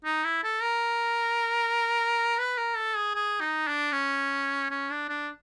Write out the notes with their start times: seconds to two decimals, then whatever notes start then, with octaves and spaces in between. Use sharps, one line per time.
0.04 D#4
0.24 E4
0.43 A4
0.62 A#4
2.38 B4
2.57 A#4
2.76 A4
2.95 G#4
3.15 G#4
3.41 D#4
3.67 D4
3.92 C#4
4.70 C#4
4.90 D4
5.09 D4